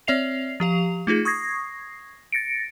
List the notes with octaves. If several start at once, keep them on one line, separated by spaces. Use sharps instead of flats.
C4 C#5 D5 E5 C7 F7
F3 G4 F5 F7
A3 D#4 F4 G#4
C#6 D#6 G#6 A#6 C7
A6 A#6 C#7 D7